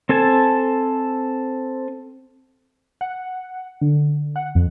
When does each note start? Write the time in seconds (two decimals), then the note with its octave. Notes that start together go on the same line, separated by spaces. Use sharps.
0.09 C4 A4 G#5 A5
3.01 F#5
3.81 D3
4.36 F#5
4.55 F2